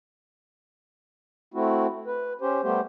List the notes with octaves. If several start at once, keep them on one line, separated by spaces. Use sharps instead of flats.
A3 C4 E4 F#4
B4
C#4 G4 C5
G3 A3 B3 G4 C5